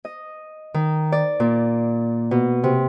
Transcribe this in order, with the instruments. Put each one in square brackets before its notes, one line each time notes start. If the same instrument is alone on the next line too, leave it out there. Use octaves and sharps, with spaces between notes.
[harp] D#5
D#3
D5
A#2
B2
C3